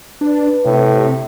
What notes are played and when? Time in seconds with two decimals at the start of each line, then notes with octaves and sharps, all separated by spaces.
0.21 D4 B4
0.65 A2 C3